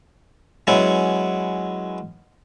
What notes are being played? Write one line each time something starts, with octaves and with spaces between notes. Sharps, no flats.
F#3 G#3 B3 C#4 E4